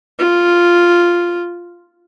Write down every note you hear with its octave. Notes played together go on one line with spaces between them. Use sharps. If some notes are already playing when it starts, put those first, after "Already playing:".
F4